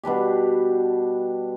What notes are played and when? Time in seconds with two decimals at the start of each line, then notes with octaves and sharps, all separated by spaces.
0.03 B2 G3 D4 G4